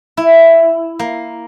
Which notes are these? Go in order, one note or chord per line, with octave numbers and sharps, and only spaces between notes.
E4
A#3